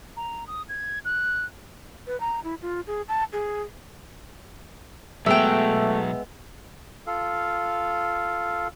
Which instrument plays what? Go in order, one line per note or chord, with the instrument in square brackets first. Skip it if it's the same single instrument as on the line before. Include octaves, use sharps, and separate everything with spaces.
[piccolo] A#5
D#6
G#6
F#6
[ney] B4
A#5
E4
F4
G#4
A5
G#4
[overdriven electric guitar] B1 F#3 [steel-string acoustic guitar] G#3 B3 [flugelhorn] A3 [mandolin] E5 G5
[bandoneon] F4 A4 F5